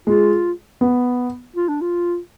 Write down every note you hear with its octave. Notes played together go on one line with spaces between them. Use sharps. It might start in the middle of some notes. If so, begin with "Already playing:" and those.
G#3 F4
B3
F4
D4
F4